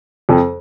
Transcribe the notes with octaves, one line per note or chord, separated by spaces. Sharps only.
F2